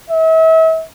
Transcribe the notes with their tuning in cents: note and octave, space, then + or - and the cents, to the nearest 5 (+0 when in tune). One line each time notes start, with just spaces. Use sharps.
E5 -40